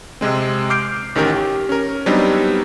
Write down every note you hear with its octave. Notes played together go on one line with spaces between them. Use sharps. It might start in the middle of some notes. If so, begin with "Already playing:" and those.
C3 G#3 C4
D6 F6 G6 C7 D7
A1 D#3 C#4 G4 A#4
G4
C#4 A#4
F#3 G3 B3 C4 D4 D#4